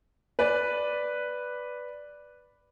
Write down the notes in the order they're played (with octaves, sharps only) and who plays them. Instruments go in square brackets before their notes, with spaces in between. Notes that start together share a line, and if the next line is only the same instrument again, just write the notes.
[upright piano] B4 D5